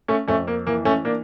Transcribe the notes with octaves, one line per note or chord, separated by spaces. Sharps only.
A3 C#4
F2 A3 C#4
A#3
E3 A#3
A3 C#4
A#3 D4